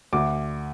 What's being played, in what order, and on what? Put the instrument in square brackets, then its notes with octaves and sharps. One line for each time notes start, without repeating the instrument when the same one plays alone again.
[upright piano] D2 D6